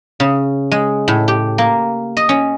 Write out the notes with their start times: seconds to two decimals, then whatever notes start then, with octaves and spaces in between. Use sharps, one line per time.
0.20 C#3
0.72 G#3
1.08 A2
1.28 G4
1.58 A#3
2.17 D#5
2.29 C#4